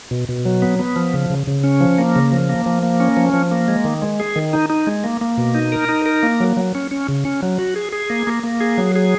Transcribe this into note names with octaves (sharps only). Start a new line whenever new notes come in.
B2
B2
F#3
B3
B3
F3
C#3
C#3
C#3
C#4
F3
A#3
C#3
F3
A#3
F3
A#3
C#4
F3
F3
A#3
G#3
D#3
G#3
G#4
D#3
D#4
D#4
G#3
A#3
A#3
B2
D#4
A#4
D#4
A#4
A#3
F#3
F#3
C#4
C#4
C#3
C#4
F#3
F#4
G#4
G#4
A#3
A#3
A#3
G#4
F#3
G#4